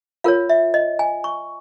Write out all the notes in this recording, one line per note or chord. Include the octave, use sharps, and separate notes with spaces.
F4 A#4 C#5 F5
E5
D#5
G#5
C#6